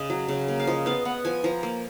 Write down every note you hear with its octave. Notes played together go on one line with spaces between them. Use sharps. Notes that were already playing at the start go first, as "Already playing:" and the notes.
Already playing: C#3 D#5
F#3
C#3
A#3
F5
F3 D#5
B3 F5
B3 F#5
F3 G#5
F3 A#5
A#3